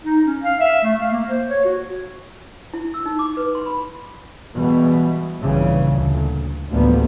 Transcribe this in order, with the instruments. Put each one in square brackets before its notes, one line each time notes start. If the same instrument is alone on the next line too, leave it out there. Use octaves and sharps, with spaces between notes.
[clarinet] D#4
C#4
F5
E5
A3
F5
A#3
C5
C#5
F#4
[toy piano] E4
E6
D#4
D6
B4
C6
B5
[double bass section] B2 E3 G3 G#3 B3
A#1 G2 A#2 C#3 E3 G3
D2 A#2
A1 D2 F3 G3 A#3 B3